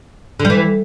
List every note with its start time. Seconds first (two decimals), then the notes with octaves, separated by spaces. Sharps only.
0.40 D3
0.45 G3
0.50 E3